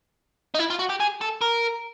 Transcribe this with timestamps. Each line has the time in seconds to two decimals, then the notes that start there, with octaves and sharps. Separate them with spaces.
0.55 D#4
0.59 E4
0.70 F4
0.79 F#4
0.90 G4
1.00 G#4
1.21 A4
1.41 A#4